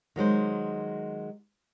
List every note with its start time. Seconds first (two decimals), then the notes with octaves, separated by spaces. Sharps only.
0.16 D#3 F#3 G#3 C5